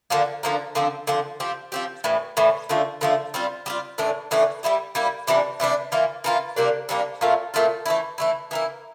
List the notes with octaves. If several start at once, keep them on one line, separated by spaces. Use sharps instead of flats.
D3 F3 A#3
D3 F3 A#3
D3 F3 C4
D3 F3 C4
F3 C4 G4
F3 C4 G4
A2 E3 G3
A2 E3 G3
D3 F3 A3
D3 F3 A3
G3 C4 F4
G3 C4 F4
A2 E3 A3 D4
A2 E3 A3 D4
G3 A#3 E4 G4
G3 A#3 E4 G4
C3 E3 G3 D4
C3 E3 G3 D4
E3 A#3 F4
E3 A#3 F4
C3 G3 A#3 D4
C3 G3 A#3 D4
A#2 A3 C4 F4
A#2 A3 C4 F4
E3 A3 E4
E3 A3 E4
E3 A#3 E4